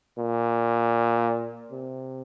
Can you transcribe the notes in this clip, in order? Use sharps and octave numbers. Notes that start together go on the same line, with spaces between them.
A#2
C3